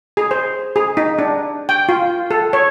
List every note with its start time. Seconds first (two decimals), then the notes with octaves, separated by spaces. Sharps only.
0.17 G#4
0.31 C5
0.76 G#4
0.97 D#4
1.19 D4
1.69 G5
1.89 F4
2.31 A4
2.53 C#5